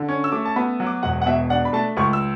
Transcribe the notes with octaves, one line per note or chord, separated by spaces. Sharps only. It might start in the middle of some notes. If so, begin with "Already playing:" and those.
Already playing: D3
C#4
E6
A3 D6
A5
B3 B5
F#3
D6
E1 F#5
F#5
B2 E5
D4 F#5
B5
A3 A5
C#2 C#6
E6